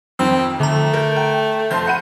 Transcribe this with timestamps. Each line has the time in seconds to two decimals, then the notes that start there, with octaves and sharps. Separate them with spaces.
0.19 F2 D#3 C4 E6
0.60 D3 A3 A#5
0.94 A#4 G6
1.16 G5
1.71 F1 C5 A5 G6
1.87 F#5 B5 D#7